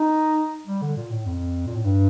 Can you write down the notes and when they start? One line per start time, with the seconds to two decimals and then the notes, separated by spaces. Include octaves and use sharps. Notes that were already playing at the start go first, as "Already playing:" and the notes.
Already playing: D#4
0.67 G3
0.81 D3
0.96 A#2
1.10 A2
1.26 F2
1.66 A#2
1.75 A2
1.84 G2